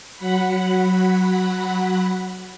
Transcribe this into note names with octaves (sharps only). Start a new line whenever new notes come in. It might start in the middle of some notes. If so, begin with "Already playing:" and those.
F#3 F#5 B5